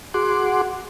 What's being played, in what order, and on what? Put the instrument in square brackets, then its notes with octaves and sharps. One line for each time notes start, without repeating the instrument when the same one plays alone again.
[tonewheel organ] F#4 G#4 F#5 C6 D6